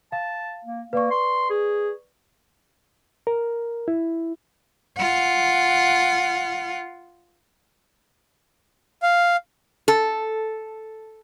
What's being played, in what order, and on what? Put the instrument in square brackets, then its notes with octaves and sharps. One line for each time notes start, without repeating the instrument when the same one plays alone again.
[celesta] F5 [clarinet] A5
[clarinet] A#3
[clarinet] A#3 [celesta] B4 D5 C#6
[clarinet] C6
G#4
[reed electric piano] A#4
E4
[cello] F4 F#5
[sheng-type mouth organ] F5
[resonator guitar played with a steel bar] A4